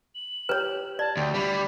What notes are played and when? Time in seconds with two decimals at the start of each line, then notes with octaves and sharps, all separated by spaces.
0.15 F#7
0.49 G4 B4 C#5
0.99 D5 A5
1.17 D2 G5
1.34 G3 D4 B5